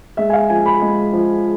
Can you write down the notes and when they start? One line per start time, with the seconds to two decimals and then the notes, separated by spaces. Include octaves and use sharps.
0.17 G#3 E5
0.30 G#5
0.33 F5
0.50 F3 G#5
0.66 B5
0.81 G#3
1.13 F3